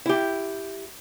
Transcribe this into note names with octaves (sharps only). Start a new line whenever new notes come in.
E4 G4